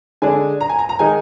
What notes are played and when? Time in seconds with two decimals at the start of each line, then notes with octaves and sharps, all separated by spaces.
0.22 D3 G#3 D4 G#5
0.61 A#5
0.69 G#5
0.79 A#5
0.89 A#5
0.99 D#3 G#3 D#4 G#5